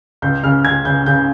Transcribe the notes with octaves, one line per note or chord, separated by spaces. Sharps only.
C#2 G6
C#3 F6
C#2 G#6
C#3 G6
C#3 G6